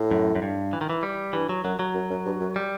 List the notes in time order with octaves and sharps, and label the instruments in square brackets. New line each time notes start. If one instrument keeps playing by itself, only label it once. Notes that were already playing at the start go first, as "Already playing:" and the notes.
Already playing: [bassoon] A2
[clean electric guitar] F#2
F#2
G2
E3
D#3
E3
G3
[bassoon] G2 [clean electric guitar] E3
[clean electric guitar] F#3
[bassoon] F#2 [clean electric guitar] F#3
[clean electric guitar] F#3
[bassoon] F#2
F#2
G2
F#2
[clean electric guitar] G3